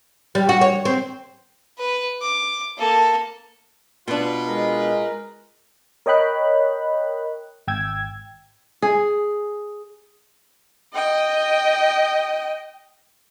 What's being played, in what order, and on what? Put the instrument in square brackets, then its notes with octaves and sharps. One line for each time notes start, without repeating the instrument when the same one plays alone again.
[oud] G3
F#4
C#5
C4
[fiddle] B4
D6
A#3 A4
[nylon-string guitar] B2 D4 [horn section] F4 B4
[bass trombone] G#3 [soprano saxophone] A#4
[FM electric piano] A#4 C#5 D#5 G5 B5 F#6
G#1 G5 E6 G#6
[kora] G#4
[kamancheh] D#5 G5